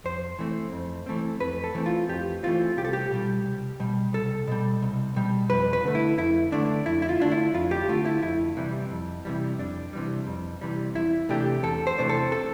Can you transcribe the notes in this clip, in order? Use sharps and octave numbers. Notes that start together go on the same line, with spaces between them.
F2 C5
E3 A3 C4
F2
E3 A3 C4
F2 B4
A4
E3 A3 C4
F4
F2 G4
E3 A3 C4 F4
C2 G4
A4
G4
B2 G3
C2
B2 G3
C2 A4
B2 G3
C2
B2 G3
F2 B4
B4
D3 A3
E4
F2 E4
D3 A3 D4
F2 E4
E4
F4
D3 A3 D4
E4
F2 F4
G4
D3 A3 F4
E4
F2 E4
C3 E3 G3
F2
C3 E3 G3
F2 D4
C3 E3 G3
F2
C3 E3 G3
E2 E4
C3 E3 A3 D4 G4
E2 A4
C5
C3 E3 A3 D4
A4
A4